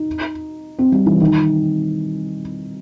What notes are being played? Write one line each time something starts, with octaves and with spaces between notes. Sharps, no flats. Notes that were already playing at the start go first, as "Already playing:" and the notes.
Already playing: D#4
C4
G3
E3
D#3